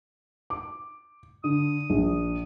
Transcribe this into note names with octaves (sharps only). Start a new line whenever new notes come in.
D6
D3 D#6
A#1